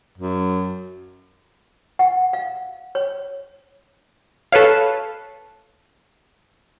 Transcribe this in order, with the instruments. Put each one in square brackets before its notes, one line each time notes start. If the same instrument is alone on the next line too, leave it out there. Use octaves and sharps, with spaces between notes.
[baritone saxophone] F#2
[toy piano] F#5
F5
C#5
[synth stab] A4 B4 C#5 F5